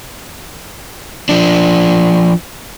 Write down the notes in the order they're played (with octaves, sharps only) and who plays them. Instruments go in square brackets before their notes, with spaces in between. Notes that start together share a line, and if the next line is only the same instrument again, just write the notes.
[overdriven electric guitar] F3 D4